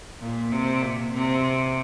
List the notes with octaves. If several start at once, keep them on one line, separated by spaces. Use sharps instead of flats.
A#2
C3
A#2
C3